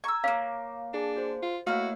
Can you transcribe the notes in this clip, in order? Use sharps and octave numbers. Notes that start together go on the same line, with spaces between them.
A#5 C#6 E6 G#6
A#3 C#4 C#5 F5 D6
D4 G#4 A5
F#4 C5
F4
A3 A#3 E4 F#4 C#5 F5